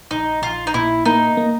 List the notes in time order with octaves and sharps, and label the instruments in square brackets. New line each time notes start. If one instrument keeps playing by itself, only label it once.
[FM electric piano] A#1 [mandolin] D#4
[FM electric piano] A#1 [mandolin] F4
[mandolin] D#4
[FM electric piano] A#2 [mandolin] E4
[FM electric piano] A#3 [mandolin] D#4
[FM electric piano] A#3